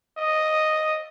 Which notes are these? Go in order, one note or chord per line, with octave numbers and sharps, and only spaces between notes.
D#5